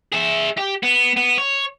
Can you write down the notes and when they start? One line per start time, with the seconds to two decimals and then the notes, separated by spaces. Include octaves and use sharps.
0.13 G#4 E5
0.58 G4
0.83 B3
1.17 B3
1.38 C#5